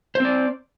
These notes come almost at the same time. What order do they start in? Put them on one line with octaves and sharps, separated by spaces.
C5 C4 D5